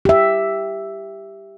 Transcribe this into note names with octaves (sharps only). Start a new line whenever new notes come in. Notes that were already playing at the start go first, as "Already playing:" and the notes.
G4 E5